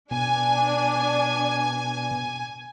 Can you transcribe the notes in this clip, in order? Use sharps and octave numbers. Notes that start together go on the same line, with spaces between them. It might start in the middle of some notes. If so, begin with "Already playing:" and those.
B2 D4 G#5